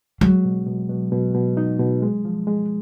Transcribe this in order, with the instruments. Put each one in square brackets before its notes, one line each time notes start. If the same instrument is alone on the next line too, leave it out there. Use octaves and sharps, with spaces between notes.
[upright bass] F#3 [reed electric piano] G#3
[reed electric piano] B2
B2
B2
B2
B2
D#4
B2
G#3
F3
G#3